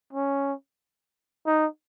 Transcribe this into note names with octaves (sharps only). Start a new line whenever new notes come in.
C#4
D#4